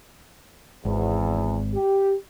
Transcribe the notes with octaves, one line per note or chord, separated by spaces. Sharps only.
G#1 E2
G4